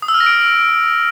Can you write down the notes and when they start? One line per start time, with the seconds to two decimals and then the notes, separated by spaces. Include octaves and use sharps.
0.02 D#6
0.08 E6
0.14 F6
0.20 A#6
0.26 D7